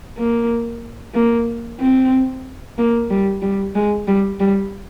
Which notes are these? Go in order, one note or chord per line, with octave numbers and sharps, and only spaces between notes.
A#3
A#3
C4
A#3
G3
G3
G#3
G3
G3